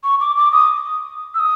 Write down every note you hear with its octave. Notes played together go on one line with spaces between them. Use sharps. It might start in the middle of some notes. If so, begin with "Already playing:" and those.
C#6
D6
D6
D#6
E6
D#6